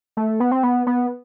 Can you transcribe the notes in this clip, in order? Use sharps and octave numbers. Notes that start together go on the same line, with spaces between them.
A3
B3
C4
B3
B3